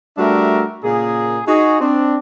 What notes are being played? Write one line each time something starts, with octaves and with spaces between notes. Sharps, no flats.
G3 A3 D4 F#4 A#4 E5
A#2 C#3 A#3 G#4
D#4 F#4 G#4
C4 D4